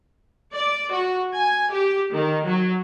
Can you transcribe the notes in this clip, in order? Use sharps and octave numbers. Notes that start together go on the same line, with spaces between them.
D5
F#4
G#5
G4
D#3
F#3